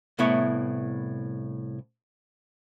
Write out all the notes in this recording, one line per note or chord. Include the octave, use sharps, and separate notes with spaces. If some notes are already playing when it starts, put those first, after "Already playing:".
C2 A2 B3 E4 C#5